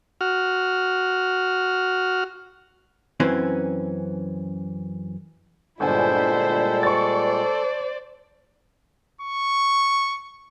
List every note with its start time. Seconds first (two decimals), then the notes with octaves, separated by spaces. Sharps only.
0.21 F#4 F6
3.20 F#2 E3 C4 C#4
5.80 G1 A#2 G3 G#3 E4 A4 C5 G#5
6.83 C5 D5 C#6 A6
9.21 C#6